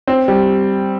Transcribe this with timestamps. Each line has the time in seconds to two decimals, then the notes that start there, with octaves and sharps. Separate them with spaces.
0.07 C4
0.28 G3